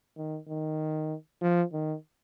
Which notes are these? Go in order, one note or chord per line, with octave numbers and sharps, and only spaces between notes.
D#3
D#3
F3
D#3